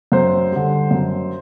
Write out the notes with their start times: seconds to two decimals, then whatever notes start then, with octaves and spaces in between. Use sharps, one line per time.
0.12 F#2 C5
0.52 D3 G3
0.91 F#2